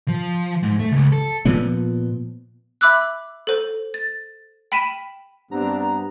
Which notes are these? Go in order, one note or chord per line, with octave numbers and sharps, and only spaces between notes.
F3
G#2
A3
C#2
A4
A#2 F3 B3
E5 B5 D6 E6 F#6
A4 C5
A6
G5 B5 B6 D#7 E7
G2 B3 C4 D4 A#5